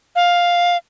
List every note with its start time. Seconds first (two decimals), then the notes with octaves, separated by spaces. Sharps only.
0.16 F5